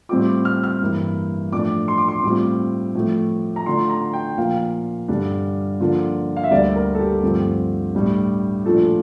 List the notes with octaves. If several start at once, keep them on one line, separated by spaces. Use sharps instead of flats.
A2 G3 C4 F4 D6
F6
F6
G2 E3 A#3 E4
A2 F3 A3 D4 D6
C6
D6
C6
A2 G3 C4 F4 D6
A2 F3 A3
A#5
D3 A3 D4 F4 C6
A#5
G5
A#2 F3 A#3 F5
G2 D3 G3 D4
D3 F3 A#3 D4 F4
F5
E5
D2 D3 G3 A#3 D4 D5
A#4
A4
G4
G2 D3 F3 A3 C4
A2 G3 D4
A#2 F3 A3 D4 F4 A4